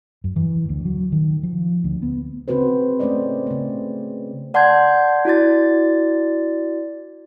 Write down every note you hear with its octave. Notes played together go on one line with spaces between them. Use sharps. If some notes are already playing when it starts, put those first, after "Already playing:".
F#2
E3
D2
F#3
D#3
F3
D2
B3
C#3 C4 F#4 B4 C5
A3 C#4 C5 D5 D#5
C#3 B3
D5 F#5 A5 C6 G6 G#6
E4 F#4 D5 A6